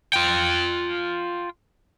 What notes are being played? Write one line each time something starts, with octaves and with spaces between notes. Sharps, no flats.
F4 G5